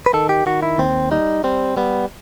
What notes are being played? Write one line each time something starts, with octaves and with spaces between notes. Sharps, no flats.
B4
D#3 A4
G4
D#3 F#4
E4
D#2 C4
G3 D#4
G3 C4
G3 B3